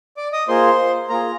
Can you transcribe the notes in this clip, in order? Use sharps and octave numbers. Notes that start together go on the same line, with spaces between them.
D5 D6
D#5 D#6
A#3 F4 G#4 C5 C6
A#3 F4 G#4 A#4 A#5